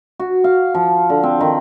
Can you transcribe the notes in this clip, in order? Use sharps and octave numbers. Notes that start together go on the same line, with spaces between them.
F#4
F5
F3
D3
C4
D#3